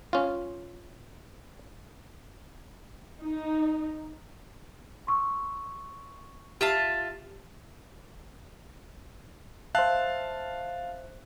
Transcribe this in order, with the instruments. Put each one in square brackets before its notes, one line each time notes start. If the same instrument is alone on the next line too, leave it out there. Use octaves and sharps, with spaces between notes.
[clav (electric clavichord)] C#4 F4
[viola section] D#4
[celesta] C6 C#6 E6
[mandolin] F4 E5 A5 [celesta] G4 C7
[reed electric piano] C5 E5 [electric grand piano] F5 A5 F#6